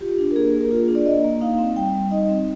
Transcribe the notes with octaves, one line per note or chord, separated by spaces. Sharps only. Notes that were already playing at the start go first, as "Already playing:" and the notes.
F4 G4
D4
A#4
A#3 G#4
A#3
A#4
F4 G#4
D4
D5
A#3 D#5
A#3
D#4 F5
C4
G3 G5
G3
D#4 D#5
C4